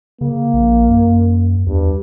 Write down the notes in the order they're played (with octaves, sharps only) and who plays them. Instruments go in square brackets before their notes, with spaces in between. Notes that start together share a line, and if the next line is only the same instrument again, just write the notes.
[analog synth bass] C#3 [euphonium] A#3
[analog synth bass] A#1
F#2
[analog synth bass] E2 [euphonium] G2